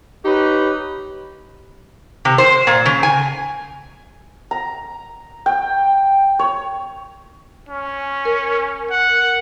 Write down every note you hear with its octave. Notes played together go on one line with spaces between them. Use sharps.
D#4 G4 B4 C#5
C3
C5
A#2
C#3
G#5
A#5
G5
C#5
C#4
A#4
F#5